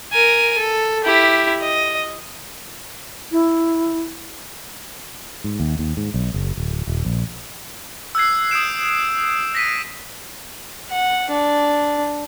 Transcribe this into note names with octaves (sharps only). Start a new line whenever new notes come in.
A#4 G#5
A4
E4 G4
D#5
E4
G#2
D#2
D#2
G#2
B1
F#1
D1
D#1
A#1
E6 F#6 G#6 C7
D#6 F#6 G6 D7 E7
A#6 B6 D#7
F#5
D4